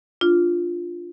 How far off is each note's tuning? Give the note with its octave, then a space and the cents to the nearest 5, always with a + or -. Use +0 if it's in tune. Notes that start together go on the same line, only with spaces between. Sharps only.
D4 +0 F4 +0